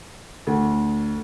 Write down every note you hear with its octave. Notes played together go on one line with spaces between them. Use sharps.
D2